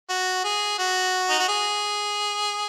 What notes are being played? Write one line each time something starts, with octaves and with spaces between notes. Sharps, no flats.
F#4
G#4
F#4
D#4
F#4
G#4